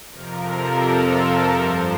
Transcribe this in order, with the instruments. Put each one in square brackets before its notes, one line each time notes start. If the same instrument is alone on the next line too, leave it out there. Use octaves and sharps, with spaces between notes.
[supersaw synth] F2 C3 F3 A#4
A4
A#4
G2 F3 C5